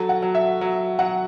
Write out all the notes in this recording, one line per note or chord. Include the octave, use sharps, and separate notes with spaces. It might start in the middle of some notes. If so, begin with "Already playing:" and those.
Already playing: F#3 A4
F#5
F#3
E5
F#3
F#3 F#5